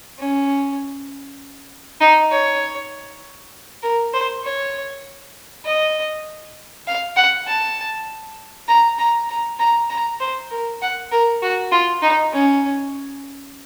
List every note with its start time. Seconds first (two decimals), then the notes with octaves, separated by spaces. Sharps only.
0.19 C#4
2.01 D#4
2.31 C#5
3.82 A#4
4.13 C5
4.44 C#5
5.65 D#5
6.87 F5
7.16 F#5
7.47 A5
8.68 A#5
8.98 A#5
9.29 A#5
9.59 A#5
9.90 A#5
10.20 C5
10.50 A#4
10.82 F#5
11.12 A#4
11.42 F#4
11.72 F4
12.02 D#4
12.32 C#4